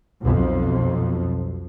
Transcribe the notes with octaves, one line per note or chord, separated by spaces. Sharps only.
B1 F2